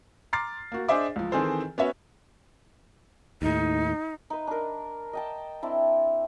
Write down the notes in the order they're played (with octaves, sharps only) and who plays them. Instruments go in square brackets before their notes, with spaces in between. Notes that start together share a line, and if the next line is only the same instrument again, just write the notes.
[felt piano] A#5 C6 D6 F6 A6 C7
A#3 F#4
D4 G#4 C5 D#5 E5 D6
C#2 F3
D#3 E3 C4 G#4 A4 C5
B3 C#4 F#4 C#5 E5
[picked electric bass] D#2 A2 [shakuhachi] D#4
[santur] D#4 B4
D4 A#4
D#5 G5 A5
C4 D4 E4